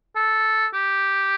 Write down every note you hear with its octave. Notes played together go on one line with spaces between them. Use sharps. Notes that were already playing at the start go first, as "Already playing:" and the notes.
A4
G4